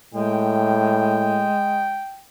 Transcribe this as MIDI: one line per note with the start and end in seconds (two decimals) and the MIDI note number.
0.14 1.54 45
0.14 2.02 56
0.14 2.23 79